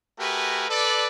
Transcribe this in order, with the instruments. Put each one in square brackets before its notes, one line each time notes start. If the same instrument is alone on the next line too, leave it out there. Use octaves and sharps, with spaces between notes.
[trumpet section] A3 F#4 G4 A#4 B4 G#5
A4 B4 D5